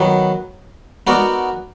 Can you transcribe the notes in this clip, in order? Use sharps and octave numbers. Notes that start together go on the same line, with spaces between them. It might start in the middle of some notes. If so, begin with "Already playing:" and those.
Already playing: D#3 F#3 B3
B3 D#4 F#4 A#4 D5